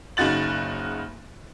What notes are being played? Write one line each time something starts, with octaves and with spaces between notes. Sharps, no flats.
F#1 C#3 D#4 F#4 A6 F#7